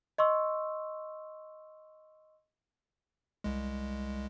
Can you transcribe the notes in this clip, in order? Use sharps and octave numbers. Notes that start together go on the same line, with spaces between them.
D#5 C6 C#6 E6
C2 G#3